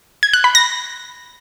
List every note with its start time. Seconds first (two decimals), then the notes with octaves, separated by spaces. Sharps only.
0.23 G#6
0.33 F#6
0.44 B5
0.55 A#6